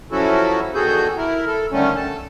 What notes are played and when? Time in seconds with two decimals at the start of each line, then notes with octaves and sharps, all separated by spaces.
0.11 F3 F#3 C#4 E4 F#4 A4
0.75 E2 D#3 F#4 G#4 A4 G6
1.17 E4 A#4
1.47 A4
1.72 D3 D#3 G3 A3 C#4
1.96 A4 A5